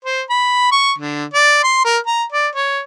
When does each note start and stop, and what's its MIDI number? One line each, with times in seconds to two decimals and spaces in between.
0.05 0.22 72
0.30 0.69 83
0.72 0.92 85
0.98 1.25 50
1.34 1.59 74
1.64 1.81 84
1.85 1.98 70
2.07 2.23 82
2.32 2.48 74
2.55 2.81 73